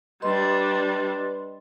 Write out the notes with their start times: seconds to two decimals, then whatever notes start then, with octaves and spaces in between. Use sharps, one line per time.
0.22 G3 D4 B4 D#5 C6